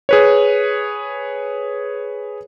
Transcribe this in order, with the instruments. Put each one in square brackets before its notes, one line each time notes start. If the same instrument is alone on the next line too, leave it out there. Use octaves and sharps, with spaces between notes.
[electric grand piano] G#4 B4 C#5